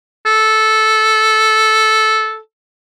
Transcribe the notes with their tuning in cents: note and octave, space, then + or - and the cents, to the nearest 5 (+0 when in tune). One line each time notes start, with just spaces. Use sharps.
A4 -10